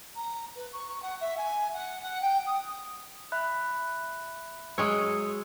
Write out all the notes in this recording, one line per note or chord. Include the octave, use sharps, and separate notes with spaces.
A#5
B4
C#6
C#6
F#5
E5
G#5
F#5
F#5
G5
D#6
E5 B5 F#6
F#3 G#3 C#5 D#6 E6